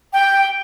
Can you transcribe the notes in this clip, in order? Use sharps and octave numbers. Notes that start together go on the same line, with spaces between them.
G5